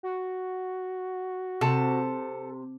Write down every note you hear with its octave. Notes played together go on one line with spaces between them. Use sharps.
F#4
C3 A4